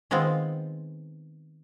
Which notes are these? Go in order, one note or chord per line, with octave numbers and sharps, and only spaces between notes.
D#3 G#3 B3 C4 F4 C5